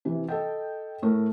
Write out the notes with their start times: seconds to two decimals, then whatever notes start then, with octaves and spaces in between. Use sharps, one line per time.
0.05 C3 E3
0.29 A4 D#5 G5
1.02 A2 A3 A#4